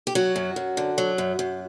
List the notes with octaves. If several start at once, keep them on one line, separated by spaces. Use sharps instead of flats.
G4
F#3 F#4
F#2
F#2
D3
F#3
F#2
F#2